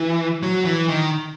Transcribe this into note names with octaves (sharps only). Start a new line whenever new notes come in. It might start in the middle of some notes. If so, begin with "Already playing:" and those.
Already playing: E3
F#3
E3
D#3